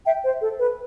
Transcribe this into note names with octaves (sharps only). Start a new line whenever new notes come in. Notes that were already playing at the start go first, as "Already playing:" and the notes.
E5 G5
C5
A4
B4